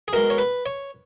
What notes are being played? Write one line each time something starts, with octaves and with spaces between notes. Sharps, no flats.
G#4
B2 G#3 A#4
C#5
B4
C#5